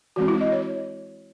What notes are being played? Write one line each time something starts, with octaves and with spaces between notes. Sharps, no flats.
E3 G#3 C4 F#4
E4
D#5
C#5